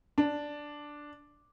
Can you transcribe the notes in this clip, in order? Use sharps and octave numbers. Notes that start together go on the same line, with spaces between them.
D4